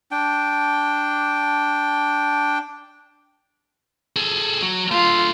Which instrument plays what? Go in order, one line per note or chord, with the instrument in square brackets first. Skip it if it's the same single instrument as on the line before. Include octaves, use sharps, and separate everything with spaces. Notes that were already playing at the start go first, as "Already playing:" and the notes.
[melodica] D4 G5
[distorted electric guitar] G#4 A4
F#3
[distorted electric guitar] A3 F5 [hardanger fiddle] F4